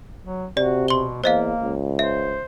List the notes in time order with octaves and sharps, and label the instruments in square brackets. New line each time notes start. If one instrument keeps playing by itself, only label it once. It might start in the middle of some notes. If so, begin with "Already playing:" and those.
[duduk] F#3
[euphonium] C3 [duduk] F#4 [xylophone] D5
[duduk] B2 [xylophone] C6 G7
[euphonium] E2 [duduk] A#3 [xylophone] C5 D#5 F5
[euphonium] C#2
[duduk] C5 [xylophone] E5